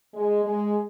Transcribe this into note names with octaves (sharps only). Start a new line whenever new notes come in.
G#3
G#3